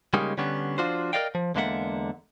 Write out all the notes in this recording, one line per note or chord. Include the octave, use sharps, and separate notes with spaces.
C#3 G3 G#3 A#3 C#4 D#4
D3 G3 B3 C#4 D4
F3 D4 F4 F#4 C5
A#4 C5 D5 D#5 F5 G5
F3
E2 D3 G#3 A#3 E5 F#5